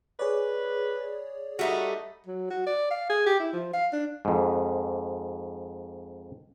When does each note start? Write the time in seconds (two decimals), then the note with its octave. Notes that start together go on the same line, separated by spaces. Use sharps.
0.19 G#4 B4 C#5 D5
1.59 G3 A3 D#4 F#4
2.26 F#3
2.50 F#4
2.66 D5
2.91 F5
3.09 G#4
3.26 G4
3.39 E4
3.53 F3
3.73 F5
3.93 D4
4.25 F2 G#2